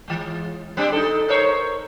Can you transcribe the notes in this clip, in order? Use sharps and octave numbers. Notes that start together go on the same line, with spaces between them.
E3 G#3
G3 C4 D4
D#4 A4
A#4 C5 C#5